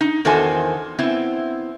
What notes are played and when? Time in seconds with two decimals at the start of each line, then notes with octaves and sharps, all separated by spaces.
0.01 D#4
0.25 E2 D#3 F#4 A4 C5 G#5
0.99 B3 C4 E4